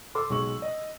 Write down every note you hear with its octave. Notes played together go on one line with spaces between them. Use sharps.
A4 C6 D6 E6
B1 G#3 C#6 F#7
D#5